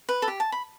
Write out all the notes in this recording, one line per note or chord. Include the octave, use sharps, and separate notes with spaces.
B4
A4
G4
A5
B5